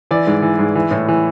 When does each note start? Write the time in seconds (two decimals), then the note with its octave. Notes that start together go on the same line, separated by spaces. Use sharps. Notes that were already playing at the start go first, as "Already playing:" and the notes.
0.11 E3 D5
0.27 G#2
0.42 E3
0.59 G#2
0.75 E3
0.91 A2
1.08 E3